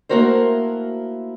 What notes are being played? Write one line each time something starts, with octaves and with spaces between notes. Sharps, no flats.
A3 A#3 E4 F#4 A#4 C5